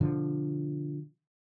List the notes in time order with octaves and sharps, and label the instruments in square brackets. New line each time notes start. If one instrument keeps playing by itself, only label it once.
[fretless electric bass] B2 D3 F3